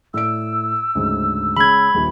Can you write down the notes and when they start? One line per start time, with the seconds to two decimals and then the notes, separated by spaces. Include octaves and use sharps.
0.14 A2 D5 E6 D7
0.95 D2 G#2 C#3
1.57 C#3 G#3 C#4 B5 G#6
1.94 D#1 A#1 G4